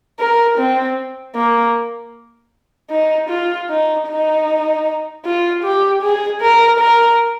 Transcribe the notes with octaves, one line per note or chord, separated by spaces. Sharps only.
A#4
C4
A#3
D#4
F4
D#4
D#4
F4
G4
G#4
A#4
A#4